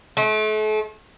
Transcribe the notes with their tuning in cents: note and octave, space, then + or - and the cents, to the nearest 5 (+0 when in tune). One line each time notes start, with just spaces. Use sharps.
A3 -40